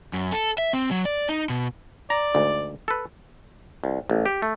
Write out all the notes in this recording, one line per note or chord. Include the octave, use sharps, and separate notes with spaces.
F#2
A4
E5
C4
F#3
D5
D#4
B2
D5 A#5
D2 G#2
A4 B4
C2
A1
G4
A3